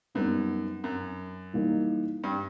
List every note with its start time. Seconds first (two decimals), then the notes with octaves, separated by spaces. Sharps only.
0.15 F#2 G3 B3 D#4
0.84 F#2
1.53 E3 G3 A#3 D#4
2.23 G2